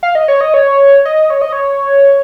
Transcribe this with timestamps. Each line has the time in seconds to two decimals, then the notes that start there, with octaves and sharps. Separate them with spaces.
0.03 F5
0.15 D#5
0.28 C#5
0.41 D#5
0.54 C#5
1.05 D#5
1.30 C#5
1.42 D#5
1.53 C#5